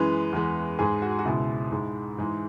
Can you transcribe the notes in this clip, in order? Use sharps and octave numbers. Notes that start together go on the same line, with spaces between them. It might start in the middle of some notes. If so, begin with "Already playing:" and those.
Already playing: F#2 E3 G#3 B4
E2 E3 G#3
G#2 G#3 G#4
F#4
F#4
C#2 B2 G#3 E4
G#2 G#3
G#2 E3 G#3